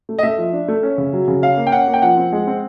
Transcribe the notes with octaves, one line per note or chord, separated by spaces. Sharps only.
A3
D#5
A3 E5
F3
D4
A3
C#4
C#3
F#3
C#3
C#4 F5
A#3
G5
C#4 F#5
A#3
G5
F3 F#5
C4
G#3
C4